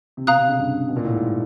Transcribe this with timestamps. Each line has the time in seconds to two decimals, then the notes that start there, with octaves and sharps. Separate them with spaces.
0.17 C3
0.27 B2 F5 A#5 D#6 F#6
0.37 C3
0.48 C#3
0.59 G2
0.88 B2
0.97 A#2
1.05 A2
1.14 G#2